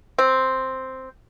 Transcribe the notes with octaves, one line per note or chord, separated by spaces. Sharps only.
C4